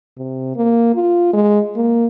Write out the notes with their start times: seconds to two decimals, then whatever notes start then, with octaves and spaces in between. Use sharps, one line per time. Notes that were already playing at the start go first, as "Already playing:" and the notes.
0.17 C3
0.56 A#3
0.95 F4
1.33 G#3
1.76 A#3